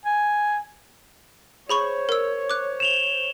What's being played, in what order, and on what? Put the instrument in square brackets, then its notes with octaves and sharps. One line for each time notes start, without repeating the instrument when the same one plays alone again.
[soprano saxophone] G#5
[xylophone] G#4 B5 C#6 [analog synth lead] C5 [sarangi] C#5
[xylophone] A#4 E6
D6 F#6
[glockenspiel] E7 F7 G7